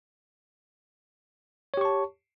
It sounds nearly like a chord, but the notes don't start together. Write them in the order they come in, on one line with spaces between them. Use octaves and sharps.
C#5 G4 C#6 A5